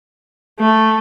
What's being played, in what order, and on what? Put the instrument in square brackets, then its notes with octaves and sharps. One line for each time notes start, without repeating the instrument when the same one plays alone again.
[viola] A3